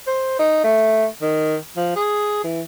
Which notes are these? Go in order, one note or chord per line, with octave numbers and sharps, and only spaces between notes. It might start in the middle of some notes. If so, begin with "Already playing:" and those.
C5
D#4
A3
D#3
F3
G#4
E3